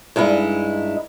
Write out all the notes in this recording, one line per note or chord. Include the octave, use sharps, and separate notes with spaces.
G2 G#3 D#4 E4